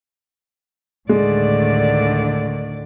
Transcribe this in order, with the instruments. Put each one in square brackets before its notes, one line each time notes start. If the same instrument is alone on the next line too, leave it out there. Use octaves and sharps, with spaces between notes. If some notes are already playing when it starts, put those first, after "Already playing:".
[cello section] D2 D#3 D5 [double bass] A2 D3 [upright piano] G#3